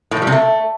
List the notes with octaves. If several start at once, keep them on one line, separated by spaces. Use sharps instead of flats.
A2
F3
G3
C3
A3